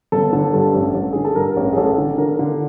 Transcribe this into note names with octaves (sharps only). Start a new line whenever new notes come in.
G1 A4
D3 A4
G2 A4
A1
A1
D3 G#4
A4
G2 A#4
A1
G#4
A1 A4
D3
D3 A#4
D3